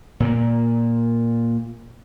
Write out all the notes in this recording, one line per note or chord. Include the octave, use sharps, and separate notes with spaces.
A#2 A#3